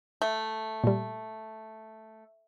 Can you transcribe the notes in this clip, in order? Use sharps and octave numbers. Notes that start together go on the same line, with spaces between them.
A3
A#2 G3